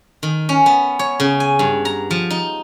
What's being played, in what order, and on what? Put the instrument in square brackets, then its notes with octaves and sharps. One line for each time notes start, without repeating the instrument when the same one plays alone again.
[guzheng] D#3
C#4
B3
C#5
C#3
G#5
G2
A#5
F3
D#4